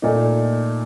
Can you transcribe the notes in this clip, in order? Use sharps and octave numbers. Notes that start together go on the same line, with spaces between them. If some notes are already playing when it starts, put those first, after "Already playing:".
A#2 A3 D#4